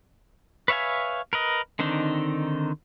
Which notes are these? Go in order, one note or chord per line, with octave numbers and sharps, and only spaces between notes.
B4 C#5 E5 F5 G#5
A#4 B4 D#5
D3 D#3 C4 D4 D#4